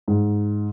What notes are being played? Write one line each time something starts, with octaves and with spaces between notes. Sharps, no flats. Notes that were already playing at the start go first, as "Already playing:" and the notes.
G#2